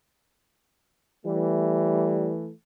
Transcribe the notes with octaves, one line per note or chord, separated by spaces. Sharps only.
E3 G3 A3